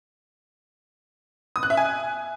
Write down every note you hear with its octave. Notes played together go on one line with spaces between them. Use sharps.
D#6
F#6
E5
G#5